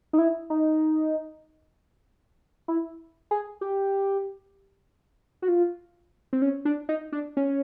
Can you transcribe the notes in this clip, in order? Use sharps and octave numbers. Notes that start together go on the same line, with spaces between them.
D#4
E4
D#4
E4
G#4
G4
F#4
F4
C4
C#4
D4
D#4
D4
C#4